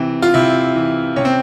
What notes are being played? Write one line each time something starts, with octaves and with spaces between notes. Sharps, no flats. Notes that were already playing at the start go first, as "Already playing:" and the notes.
Already playing: C3 E3 C4
F4
C3 E4
E3
C3 C#4
C4